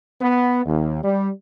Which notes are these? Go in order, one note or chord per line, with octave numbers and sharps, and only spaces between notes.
B3
D#2
G3